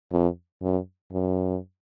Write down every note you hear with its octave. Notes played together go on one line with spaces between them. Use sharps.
F2
F#2
F#2